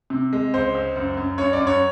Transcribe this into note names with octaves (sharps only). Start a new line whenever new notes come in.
C3
G#3
C#2 C5
C#2
F#2
F#2
F#2 C#5
D5
F#2
C#5